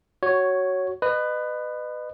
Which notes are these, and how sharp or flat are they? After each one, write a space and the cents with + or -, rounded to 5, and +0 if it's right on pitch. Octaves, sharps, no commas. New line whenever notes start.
F#4 +10 C#5 +0
B4 +15 D#5 -30